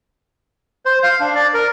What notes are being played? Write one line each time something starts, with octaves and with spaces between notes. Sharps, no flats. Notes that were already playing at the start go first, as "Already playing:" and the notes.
C5
F5
D4
D5
A#4